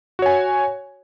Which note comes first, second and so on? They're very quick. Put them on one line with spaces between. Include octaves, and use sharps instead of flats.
F#4 C#5 G#5